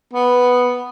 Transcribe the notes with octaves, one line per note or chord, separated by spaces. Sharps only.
B3